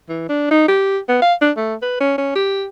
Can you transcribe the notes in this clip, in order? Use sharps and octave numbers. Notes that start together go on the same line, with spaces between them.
E3
D4
D#4
G4
B3
F5
D4
A3
B4
C#4
C#4
G4